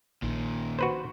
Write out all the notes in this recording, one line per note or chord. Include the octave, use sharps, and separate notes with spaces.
A#1 A#2 D#3
F#4 B4 C5